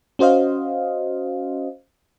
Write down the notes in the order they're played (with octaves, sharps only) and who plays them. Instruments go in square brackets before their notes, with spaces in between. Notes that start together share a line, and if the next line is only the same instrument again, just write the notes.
[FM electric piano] C#4 F#4 C5 D#5 F5